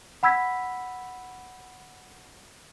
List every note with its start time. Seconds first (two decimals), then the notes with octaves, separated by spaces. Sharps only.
0.23 F#5 B5 E6 G#6 B6